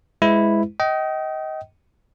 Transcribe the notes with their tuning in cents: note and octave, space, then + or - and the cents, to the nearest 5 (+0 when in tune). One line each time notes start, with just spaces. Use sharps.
G#3 +0 E4 +0 B4 +25
D#5 +20 G5 -30